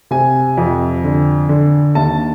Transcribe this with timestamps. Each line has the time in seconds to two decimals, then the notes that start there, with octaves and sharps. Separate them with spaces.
0.11 C3 G#5
0.58 F2
1.04 D3
1.49 D3
1.95 D#2 A5